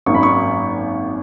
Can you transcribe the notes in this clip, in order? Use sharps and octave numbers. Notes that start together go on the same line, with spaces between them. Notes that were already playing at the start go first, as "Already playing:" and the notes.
G#1 F#2 D#3 A#3 C#6
B5
C#6